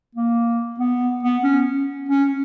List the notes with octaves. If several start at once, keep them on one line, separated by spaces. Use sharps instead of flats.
A#3
B3
B3
C#4
C#4